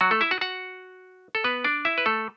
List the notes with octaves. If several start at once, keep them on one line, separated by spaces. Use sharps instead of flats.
F#3 F#4
A3 A4
E4 E5
F#4 F#5
F#4 F#5
A4
B3 B4
D4 D5
E4 E5
B4
A3 A4